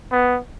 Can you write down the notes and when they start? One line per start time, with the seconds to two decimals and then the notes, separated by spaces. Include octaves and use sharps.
0.12 B3